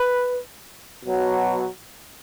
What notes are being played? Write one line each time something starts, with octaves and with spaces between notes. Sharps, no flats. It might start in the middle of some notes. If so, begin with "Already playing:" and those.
Already playing: B4
B2 F#3